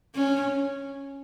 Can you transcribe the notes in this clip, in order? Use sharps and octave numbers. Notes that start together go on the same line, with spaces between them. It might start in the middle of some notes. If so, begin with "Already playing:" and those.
C#4